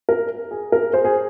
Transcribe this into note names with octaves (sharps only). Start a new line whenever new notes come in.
A#4
G#4
A#4
G#4 C5
G#4